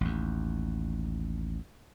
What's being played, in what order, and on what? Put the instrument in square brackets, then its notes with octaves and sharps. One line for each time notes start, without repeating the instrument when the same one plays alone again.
[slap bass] A1 D#2